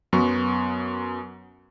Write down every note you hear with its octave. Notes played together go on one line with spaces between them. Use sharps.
F#2 F#3 B3 C#6